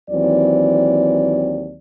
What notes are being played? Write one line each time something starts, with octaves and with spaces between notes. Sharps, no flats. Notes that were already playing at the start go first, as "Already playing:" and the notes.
D#2 E3 F#3 C4 D5